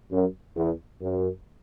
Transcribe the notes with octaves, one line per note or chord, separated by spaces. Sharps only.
F#2
E2
F#2